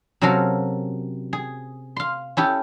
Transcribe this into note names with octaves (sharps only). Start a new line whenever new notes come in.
C3 F#3 C#4 A4 A#4 F5
G#4
F5 C6
C#4 E4 G4 A4